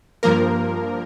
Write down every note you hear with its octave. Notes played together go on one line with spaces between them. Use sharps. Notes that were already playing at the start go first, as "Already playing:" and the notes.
G2 F3 A#3 A#4